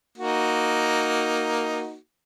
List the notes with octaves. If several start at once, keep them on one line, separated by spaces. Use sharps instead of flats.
A#3 D#4 F#4